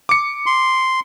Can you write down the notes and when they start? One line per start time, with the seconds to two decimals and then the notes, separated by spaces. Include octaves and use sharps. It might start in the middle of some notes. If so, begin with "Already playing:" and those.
0.09 D6 C#7
0.46 C6